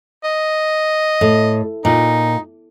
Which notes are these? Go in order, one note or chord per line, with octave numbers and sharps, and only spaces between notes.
D#5
A2
A#2 D#4